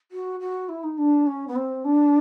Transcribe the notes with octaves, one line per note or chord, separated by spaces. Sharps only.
F#4
F#4
E4
D#4
D4
C#4
B3
C4
D4